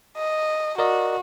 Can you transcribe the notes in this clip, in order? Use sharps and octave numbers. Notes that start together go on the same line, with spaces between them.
D#5
F#4 A#4 D5 D#5